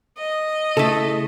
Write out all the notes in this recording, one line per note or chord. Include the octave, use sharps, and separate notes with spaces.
D#5
C#3 A3 E4 A4